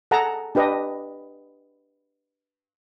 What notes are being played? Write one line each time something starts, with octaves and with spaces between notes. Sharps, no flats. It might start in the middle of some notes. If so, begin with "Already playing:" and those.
G#4 A4 F#5 A5 A#5
D4 G4 B4 D#5